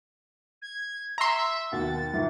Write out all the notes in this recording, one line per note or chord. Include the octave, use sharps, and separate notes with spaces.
G#6
E5 A#5 C6
D#2 B2 F#5 A6
G1 D#3